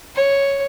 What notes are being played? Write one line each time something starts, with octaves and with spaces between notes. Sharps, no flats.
C#5